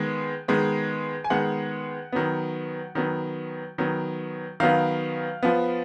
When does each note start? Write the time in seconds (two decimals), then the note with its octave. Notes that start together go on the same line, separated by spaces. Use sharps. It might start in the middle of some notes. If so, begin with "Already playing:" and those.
Already playing: D#3 G#3 B3
0.48 D#3 G#3 B3
1.24 G#5
1.30 D#3 G#3 B3 F#5
2.12 D#3 F#3 B3
2.95 D#3 F#3 B3
3.78 D#3 F#3 B3
4.60 D#3 F#3 B3 F5
5.43 F3 B3